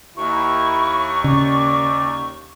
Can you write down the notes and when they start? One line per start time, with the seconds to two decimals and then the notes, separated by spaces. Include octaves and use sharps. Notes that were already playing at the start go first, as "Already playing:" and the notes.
0.17 D#2 E4 C#6
1.24 C#3 D5